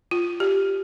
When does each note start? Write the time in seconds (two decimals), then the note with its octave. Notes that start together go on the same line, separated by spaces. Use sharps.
0.11 F4
0.40 G4